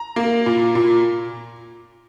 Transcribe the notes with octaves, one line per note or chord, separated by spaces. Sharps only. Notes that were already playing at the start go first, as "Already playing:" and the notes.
Already playing: A#5
A#3
A#2
A#2